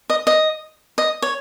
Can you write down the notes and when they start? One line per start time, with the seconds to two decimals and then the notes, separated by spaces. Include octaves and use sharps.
0.10 D#5
0.27 D#5
0.98 D#5
1.22 C#5